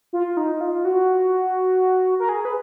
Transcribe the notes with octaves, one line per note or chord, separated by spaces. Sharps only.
F4
D#4
F4
F#4
A#4
G#4
B4